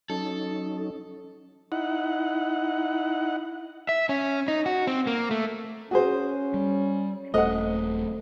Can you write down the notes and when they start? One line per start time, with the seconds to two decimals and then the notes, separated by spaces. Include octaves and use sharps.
0.10 F#3 C#4 D#4 A4
1.72 D#4 E4 F#5
3.89 E5
4.09 C#4
4.48 D#4
4.66 F#4
4.87 C4
5.07 A#3
5.31 A3
5.91 C#4 F#4 G#4 C5
6.54 G3
7.34 D#1 A3 A4 C5 D#5 F#5